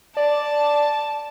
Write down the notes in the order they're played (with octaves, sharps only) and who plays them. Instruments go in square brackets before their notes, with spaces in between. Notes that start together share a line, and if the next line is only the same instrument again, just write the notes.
[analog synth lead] D5 [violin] A5